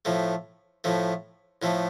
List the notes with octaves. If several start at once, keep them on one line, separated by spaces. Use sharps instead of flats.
A2 F3 A3
A2 F3 A3
A2 F3 A3